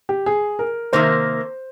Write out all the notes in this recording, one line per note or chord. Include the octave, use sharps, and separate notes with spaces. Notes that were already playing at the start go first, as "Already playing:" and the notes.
G4
G#4
A#4
C3 D#3 A#3 C5